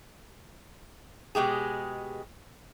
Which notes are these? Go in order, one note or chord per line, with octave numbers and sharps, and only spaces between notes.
B2 G#3 G4 G#4